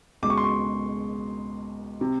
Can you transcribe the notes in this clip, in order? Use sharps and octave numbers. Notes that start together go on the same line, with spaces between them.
C#2 B2 G#3 D6
C#6
C6
C#6
C3